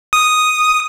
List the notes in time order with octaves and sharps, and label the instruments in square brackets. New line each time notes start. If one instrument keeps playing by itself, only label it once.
[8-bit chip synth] D#6